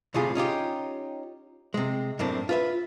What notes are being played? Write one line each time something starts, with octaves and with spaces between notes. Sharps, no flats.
D2 A2 C3 G3 F4 G#4
C#4 D#4 F4 G4
C3 G#3
F#2 A2 A#3 C4 D4
F4 B4 E5